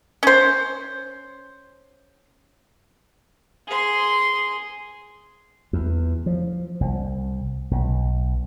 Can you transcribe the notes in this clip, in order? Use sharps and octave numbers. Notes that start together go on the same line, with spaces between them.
C#4 C5
G#4 C6
E2
F3
C2
B1